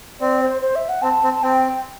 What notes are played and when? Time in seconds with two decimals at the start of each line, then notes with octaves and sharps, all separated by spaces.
0.21 C4 D5
0.41 C5
0.62 C5
0.76 E5
0.89 F#5
1.02 C4 A5
1.23 C4
1.34 A5
1.43 C4 G5